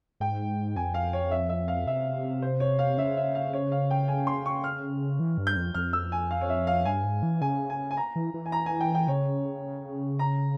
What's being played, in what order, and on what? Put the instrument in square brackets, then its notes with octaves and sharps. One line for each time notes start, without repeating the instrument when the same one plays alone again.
[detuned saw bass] G#2 [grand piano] G5
[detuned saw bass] F2 [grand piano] G#5
[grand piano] F5
C#5
E5
E5
F5
[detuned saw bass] C3 [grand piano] E5
[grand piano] C5
C#5
F5
[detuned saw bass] C#3 [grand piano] E5
[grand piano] E5
F5
C#5
F5
G5
G#5
C6
C#6
F6
[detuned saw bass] E3
G2
[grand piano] G6
[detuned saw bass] F2
[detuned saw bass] F2 [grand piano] F6
[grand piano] E6
G#5
F5
C#5
E5
F5
[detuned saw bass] G2 [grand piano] G#5
[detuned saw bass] G#2
E3
[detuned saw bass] C#3 [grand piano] G#5
[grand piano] G#5
G#5
A#5
[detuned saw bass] E3
E3
[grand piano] G#5
A#5
G#5
G5
G5
[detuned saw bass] C#3 [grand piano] C#5
[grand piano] A#5